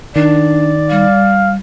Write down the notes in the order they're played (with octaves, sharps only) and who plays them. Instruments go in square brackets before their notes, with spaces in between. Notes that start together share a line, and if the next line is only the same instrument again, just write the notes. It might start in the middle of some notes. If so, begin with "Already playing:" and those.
[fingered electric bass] D#3 [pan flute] D4 [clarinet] D5
[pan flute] G3 [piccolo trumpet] F5